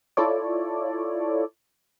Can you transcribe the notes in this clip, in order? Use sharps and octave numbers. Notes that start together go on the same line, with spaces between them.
E4 F4 A4 C#5 D5